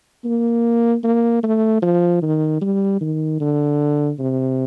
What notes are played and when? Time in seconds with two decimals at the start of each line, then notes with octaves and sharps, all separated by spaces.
0.25 A#3
1.04 A#3
1.43 A3
1.82 F3
2.22 D#3
2.61 G3
3.01 D#3
3.40 D3
4.19 C3